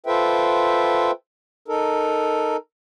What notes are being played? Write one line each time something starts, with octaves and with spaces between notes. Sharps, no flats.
F4 A4 B4 C5 E5 G5
D#4 A4 A#4